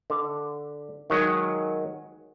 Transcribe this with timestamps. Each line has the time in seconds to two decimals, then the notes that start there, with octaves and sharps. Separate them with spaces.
0.10 D3
1.10 D#3 F#3 G#3